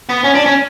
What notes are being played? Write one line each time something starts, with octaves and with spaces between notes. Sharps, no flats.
B3
C#4
D4
C#4